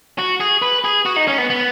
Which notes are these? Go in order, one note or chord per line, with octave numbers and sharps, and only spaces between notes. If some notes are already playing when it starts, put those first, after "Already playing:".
F#4
G#4
B4
G#4
F#4
D#4
C#4
B3
B3